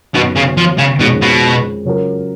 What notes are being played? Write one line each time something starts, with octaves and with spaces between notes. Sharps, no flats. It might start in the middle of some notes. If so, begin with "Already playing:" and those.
F#2 B2 D#3 F#3 B3 F#4
C#3
F3
C#3
F2 B2 D#3 G#3 C#4
B2
C#3 F#3 C#4 F4 A#4